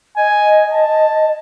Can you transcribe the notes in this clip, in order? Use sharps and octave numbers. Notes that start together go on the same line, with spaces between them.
D#5 G#5
A5